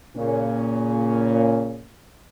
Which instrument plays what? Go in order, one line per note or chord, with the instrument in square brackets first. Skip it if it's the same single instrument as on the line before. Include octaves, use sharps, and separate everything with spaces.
[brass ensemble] A#2 C#3 C#4